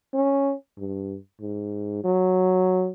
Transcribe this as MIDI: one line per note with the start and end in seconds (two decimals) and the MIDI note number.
0.14 0.54 61
0.78 1.17 43
1.41 2.04 44
2.04 2.91 54